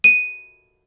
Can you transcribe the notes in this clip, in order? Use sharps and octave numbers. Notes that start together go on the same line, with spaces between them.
D#7